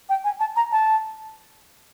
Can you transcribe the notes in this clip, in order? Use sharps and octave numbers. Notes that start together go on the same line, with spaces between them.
G5
G#5
A5
A#5
A5